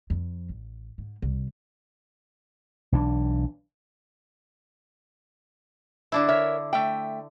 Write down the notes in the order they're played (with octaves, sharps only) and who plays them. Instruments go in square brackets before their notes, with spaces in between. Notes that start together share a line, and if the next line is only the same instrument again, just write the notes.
[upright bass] F2
A1
G#2
C2
[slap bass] B1 E3 D4
[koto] D3 D4 E4
[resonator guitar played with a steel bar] A#4 C#5 E5
A3 E5 G5